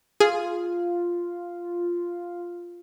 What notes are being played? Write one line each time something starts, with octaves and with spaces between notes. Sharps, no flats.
F4 G#4